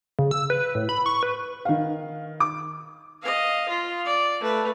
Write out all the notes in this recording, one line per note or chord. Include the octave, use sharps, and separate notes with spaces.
C#3
E6
B4
A2
B5
C#6
B4
D#3 F5
D6
D#5 F5
F4
D5
A3 B4